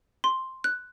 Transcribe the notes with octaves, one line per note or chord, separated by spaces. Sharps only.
C6
F#6